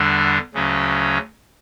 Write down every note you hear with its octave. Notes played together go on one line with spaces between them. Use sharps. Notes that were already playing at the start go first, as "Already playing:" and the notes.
Already playing: E2 D3 G3 D4
D2 C#3 F#3 C#4